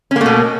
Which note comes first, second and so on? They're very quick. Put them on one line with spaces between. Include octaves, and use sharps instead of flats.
C#4 A#3 A3 B2